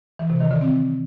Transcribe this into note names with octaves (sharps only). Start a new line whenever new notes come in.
E3
C3
D#3
D3
C4